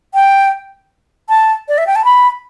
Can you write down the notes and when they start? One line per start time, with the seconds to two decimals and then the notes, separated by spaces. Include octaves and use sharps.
0.14 G5
1.29 A5
1.68 D5
1.78 E5
1.87 G5
1.96 A5
2.05 B5